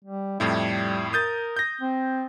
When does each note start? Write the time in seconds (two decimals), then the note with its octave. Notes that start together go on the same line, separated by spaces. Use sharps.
0.05 G3
0.40 F2 A2 G3 E4
1.13 A#4 D#6 G6 A6
1.57 G6 A#6
1.81 C4